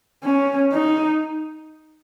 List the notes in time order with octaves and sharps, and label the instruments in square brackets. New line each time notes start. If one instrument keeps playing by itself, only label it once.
[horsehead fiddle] C#4
D#4